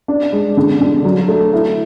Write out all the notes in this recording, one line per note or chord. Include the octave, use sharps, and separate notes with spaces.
D4
G#3
D3
D3
F#3
A3
E4